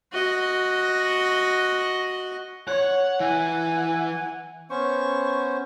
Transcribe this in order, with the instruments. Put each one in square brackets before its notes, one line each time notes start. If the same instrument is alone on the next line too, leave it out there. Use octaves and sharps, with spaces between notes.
[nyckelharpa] F#4 D#5
[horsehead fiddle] C#5 [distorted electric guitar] F#5
[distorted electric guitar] E3 [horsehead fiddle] F#5 G#5
[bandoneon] B3 C#4 C5 [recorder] C#6